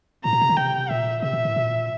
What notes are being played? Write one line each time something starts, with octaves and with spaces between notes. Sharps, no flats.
A2 A#5
A#2
C3
D3
C3 G5
A#2 E5
C3 E5
A#2
A2
A#2